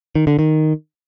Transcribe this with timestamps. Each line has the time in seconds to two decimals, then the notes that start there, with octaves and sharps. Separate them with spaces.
0.15 D#3
0.27 D3
0.39 D#3